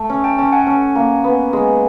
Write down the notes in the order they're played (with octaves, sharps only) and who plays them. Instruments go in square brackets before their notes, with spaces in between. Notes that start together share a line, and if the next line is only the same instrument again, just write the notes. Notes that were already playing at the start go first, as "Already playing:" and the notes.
Already playing: [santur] A3
C#4
[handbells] G5 A5
[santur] C#4 [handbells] G5 A5
[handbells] F#5 G#5
[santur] C#4
A#3
B3
G#3